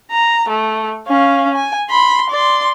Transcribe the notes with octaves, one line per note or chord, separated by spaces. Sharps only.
A#5
A3
C#4 F5
G#5
B5 C6
D5 C6